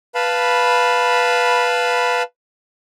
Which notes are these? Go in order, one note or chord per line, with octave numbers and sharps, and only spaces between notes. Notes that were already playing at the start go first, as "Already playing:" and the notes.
B4 F5 A5 B5